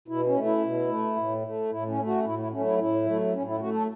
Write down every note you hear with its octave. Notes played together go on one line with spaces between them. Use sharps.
B2 E4
C#4
A3
E4
B2
A3
A2
A3
A2 E4
C#4
A3
F#4
A2 E4
E4
F#3 A3 C#4
E4
A2 E4
F#3 A3
A2 C#4
E4
A3 F#4
A4